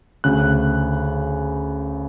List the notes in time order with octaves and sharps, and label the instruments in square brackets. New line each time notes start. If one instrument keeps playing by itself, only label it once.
[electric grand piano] D2 C#3 F#6